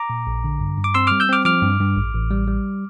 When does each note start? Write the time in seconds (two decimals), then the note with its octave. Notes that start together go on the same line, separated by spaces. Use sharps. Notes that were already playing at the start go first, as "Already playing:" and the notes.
Already playing: A#5 D6
0.10 A#2
0.27 A#1
0.44 D3
0.60 G2
0.78 G2
0.84 D6
0.94 C4 C6 E6
1.07 G3 D6 F6
1.20 E6 G6
1.29 C4 D6 F6
1.45 F3 D6 F6
1.63 G2
1.80 G2
1.96 A1
2.14 A1
2.31 G3
2.48 G3